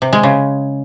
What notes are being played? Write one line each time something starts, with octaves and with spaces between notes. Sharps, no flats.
C3
G#3
C#3